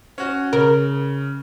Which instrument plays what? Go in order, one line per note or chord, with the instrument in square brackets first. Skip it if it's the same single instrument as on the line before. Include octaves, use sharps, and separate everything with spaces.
[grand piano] C#4 F#4
[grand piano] C#3 [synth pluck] A#4